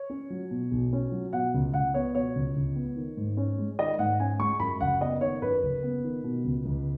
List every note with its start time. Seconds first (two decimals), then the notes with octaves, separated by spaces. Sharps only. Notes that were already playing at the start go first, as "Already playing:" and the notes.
Already playing: C#5
0.10 C#4
0.30 F#3
0.51 B2
0.71 B1
0.93 C#4
1.12 F#3
1.33 B2 F#5
1.54 C#2
1.74 C#2 F#5
1.94 B3 C#5
2.14 B2 C#5
2.35 C#2
2.56 C#2
2.75 B3
2.96 D#3
3.17 G#2
3.37 C#4
3.58 G#3
3.79 D#3 D#5
3.99 G#2 F#5
4.20 C#4 G#5
4.40 G#3 C#6
4.60 F#2 B5
4.81 F#1 F#5
5.01 B3 D#5
5.21 D#3 C#5
5.42 F#2 B4
5.63 F#1
5.83 B3
6.04 D#3
6.24 B2
6.44 C#2
6.65 C#2